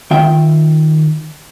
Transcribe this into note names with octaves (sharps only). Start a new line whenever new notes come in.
D#3 F4 E5 G5